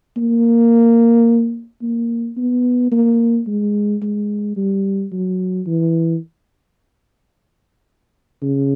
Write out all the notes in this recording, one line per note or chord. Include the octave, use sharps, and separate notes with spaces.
A#3
A#3
B3
A#3
G#3
G#3
G3
F#3
E3
C#3